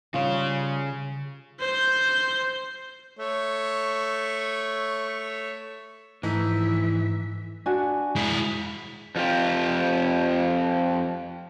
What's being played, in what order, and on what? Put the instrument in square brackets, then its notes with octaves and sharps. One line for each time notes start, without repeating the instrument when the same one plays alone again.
[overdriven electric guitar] C#3 C#5 [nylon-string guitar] G3 F4
[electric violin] C5 G6
[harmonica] A3 C#5
[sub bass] G#2 [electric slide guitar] E3 [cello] F3 E5 [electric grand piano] A3 D#4
[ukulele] D4 F#4 G#5
[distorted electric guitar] G#3 E4
[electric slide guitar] F2 F4 G4